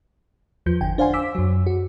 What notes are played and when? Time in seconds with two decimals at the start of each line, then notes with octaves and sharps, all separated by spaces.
0.66 E2 F3 G6
0.81 G1 D3 G5 G#5
0.98 D4 C5 F5 F#5 G#5 C6
1.13 D6 E6 B6
1.35 F#2 F#3
1.66 F#4